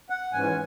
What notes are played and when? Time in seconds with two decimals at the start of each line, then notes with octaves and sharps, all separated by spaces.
0.10 F#5
0.32 G#2 E3 C#4 G#5